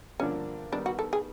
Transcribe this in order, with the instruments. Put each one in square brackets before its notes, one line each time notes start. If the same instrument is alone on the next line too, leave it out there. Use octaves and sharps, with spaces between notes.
[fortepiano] G2 D3 F3 A#3 D4 [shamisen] C#4
[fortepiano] D#3 G3 B3 D#4 [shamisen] D4
[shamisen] F#4
A4
G#4